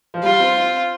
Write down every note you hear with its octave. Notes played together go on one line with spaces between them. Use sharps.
F3
G3 F4
C4
C4